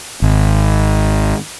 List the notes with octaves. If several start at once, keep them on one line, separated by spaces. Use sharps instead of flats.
G#1